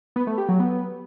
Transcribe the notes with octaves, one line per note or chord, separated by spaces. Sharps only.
B3
A3
G4
F#3
B3